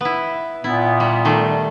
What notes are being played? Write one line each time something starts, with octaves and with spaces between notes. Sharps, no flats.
B3 E4
A#2 B3 E4
G3
D#3 G3 A3